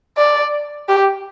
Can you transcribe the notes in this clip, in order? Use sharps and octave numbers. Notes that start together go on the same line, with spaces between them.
D5
G4